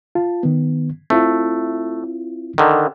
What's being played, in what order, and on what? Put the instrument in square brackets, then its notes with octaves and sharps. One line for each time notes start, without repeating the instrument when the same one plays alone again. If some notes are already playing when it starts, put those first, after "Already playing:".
[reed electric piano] F4 A5
D#3 B3
[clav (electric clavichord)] A3 [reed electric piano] C4 E4 F4
[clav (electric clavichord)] D3 D#3